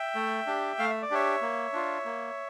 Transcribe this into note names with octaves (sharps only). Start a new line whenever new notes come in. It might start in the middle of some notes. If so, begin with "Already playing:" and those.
Already playing: E5 G5
A3
D4 G4
A3 F5
E5
D5
D4 G4 C#5 E5
A#3
D4 F4
A#3